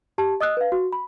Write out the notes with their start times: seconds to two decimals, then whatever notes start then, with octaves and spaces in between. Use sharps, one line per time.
0.18 G4 A5
0.41 D#5 D#6 E6 F#6
0.57 B4 F5
0.72 F#4
0.92 B5